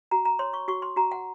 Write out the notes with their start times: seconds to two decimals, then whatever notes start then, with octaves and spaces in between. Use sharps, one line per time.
0.11 F#4 A#5
0.25 A#5
0.39 C#5 C6
0.53 C#6
0.68 F#4 C#6
0.82 C6
0.96 F#4 A#5
1.12 F#5